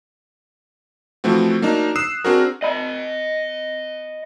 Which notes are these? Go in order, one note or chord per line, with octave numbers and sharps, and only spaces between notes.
E3 F3 A3 C4 F#4
F#3 A#3 D4 D#4
D#6 E6 F#6 C7 E7
C4 D4 F#4 G#4 A#4
D#5 B5